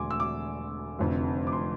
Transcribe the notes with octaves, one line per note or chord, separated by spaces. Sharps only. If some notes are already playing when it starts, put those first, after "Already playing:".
Already playing: E1 D3 A3 G#5 C6 D6
E6
D6
F1 F2 D3
D6
C6